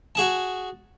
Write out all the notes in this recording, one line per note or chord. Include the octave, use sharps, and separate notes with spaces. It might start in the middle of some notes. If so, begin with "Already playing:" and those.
F#4 G#4 A5